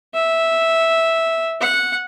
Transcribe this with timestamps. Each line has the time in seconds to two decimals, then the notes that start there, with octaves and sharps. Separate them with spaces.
0.14 E5
1.60 F#5